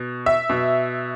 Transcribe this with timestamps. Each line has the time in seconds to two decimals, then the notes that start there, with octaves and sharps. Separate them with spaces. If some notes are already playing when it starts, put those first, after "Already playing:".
Already playing: B2
0.26 E5
0.50 B2